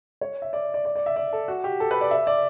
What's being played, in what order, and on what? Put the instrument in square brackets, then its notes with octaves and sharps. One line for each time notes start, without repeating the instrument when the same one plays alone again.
[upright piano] C#5
E5
D5
D5
D5
D5
E5
D5
A4
F#4
G4
A4
B4
D5
E5
D5